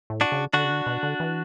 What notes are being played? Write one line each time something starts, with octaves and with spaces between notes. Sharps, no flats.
A2
D4 F#4
C#3
D3 D4 F#4
C#3
D3
B2
D3
E3